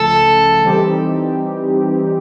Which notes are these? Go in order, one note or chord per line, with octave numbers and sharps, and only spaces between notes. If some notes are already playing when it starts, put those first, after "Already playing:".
Already playing: C#2 C#3 F3 A3 A4
E3 G3 C4 D#4 G4